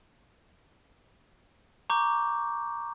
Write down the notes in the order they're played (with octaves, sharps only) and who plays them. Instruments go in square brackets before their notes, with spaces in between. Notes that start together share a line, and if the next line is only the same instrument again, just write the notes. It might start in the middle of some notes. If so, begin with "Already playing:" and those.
[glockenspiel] A#5 C#6 D6 G6